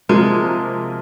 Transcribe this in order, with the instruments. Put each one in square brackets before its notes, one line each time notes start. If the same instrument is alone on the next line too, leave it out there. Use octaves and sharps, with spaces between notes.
[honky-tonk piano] C3 F3 A#3 [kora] G#3